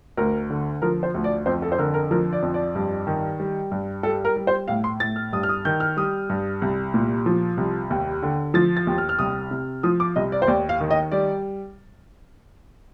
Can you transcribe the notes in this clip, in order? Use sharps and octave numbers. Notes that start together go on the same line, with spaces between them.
D2 A#4
D3
F3 A#4
C5
D2
D5
F2 C5
A4
C5
D3 A#4
A#4
F3 A#4
D5
F2
D5
G2
D#3
G3
G2
G3 A4
A#4
G3
C5
A2 F5
C6
A2 A6
F6
G2 D#6
F6
D#6
D#3 G6
F6
G3 D#6
G2
C2
A#2
F3
C2
D#2
D3
F3 A6
A6
D#2
F6
F6
C2 D#6
C3
F3 D#6
D6
C2 D#5
D5
C5
D#2 D5
F5
D#3
D#5
G3 D5